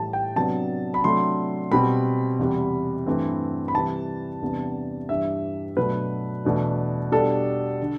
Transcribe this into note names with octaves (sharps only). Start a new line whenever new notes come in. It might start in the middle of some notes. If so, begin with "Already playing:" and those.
Already playing: A2 E3 G3 A5
G5
C3 F#3 B3 D4 A5
B5
C3 F#3 A3 D4 C6
B2 G3 C4 B5
E2 C3 G3
G2 E3 A3 C4
B5
C3 E3 G3 A5
E2 C3 G3 B3 D4
G2 E3 G3 E5
B2 F#3 A3 D4 B4
E2 B2 A3 D4
B2 G3 D4 A4
D3